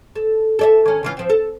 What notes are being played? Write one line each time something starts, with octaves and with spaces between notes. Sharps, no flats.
A4
A4 D5 E5
D#3 C#4
C#3 E3 F4
F3 C4
A4